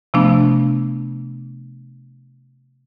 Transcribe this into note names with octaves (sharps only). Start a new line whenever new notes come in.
C3 F3 A3 B3 D4